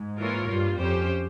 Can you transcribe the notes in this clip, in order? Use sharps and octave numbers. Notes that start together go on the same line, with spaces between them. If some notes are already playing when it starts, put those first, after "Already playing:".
Already playing: G#2
E3 A#3 F4 A#4 C#5
G2 G3 A#3 F4
F2 C#4 G4 C5